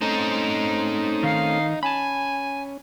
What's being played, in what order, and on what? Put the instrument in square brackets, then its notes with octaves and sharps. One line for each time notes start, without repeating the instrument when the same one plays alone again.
[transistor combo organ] A3 C4 C#4 [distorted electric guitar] D#4 C5 [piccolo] A#5
[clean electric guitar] D#3 [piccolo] F5
[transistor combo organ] C#4 [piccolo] G#5 [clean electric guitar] A5 B5